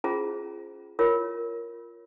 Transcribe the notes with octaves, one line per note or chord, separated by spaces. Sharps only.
C#4 F4 G#4 C5 A#5
F4 A#4 C#5